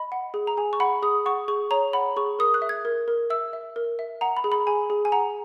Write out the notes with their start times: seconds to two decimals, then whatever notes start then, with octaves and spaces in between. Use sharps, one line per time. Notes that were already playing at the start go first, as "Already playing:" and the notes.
Already playing: D#5 B5
0.12 F#5
0.34 G#4
0.47 A#5
0.57 G#4 G#5
0.73 C#6
0.80 F#5 B5
1.02 G#4 D#6
1.26 F#5 C#6
1.48 G#4 C#6
1.71 C#5 A#5
1.93 F#5 B5
2.16 G#4 C#6
2.39 A#4 D#6
2.54 F#6
2.62 E5
2.69 G#6
2.85 A#4
3.08 A#4
3.30 E5 E6
3.53 E5
3.76 A#4
3.99 E5
4.21 F#5 A#5
4.37 B5
4.44 G#4
4.52 B5
4.67 G#4 G#5
4.90 G#4
5.05 G#5
5.12 F#5 A#5